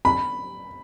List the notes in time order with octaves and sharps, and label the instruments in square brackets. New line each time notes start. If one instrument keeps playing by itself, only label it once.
[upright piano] B5